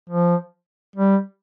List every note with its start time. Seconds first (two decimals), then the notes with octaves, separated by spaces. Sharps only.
0.10 F3
0.96 G3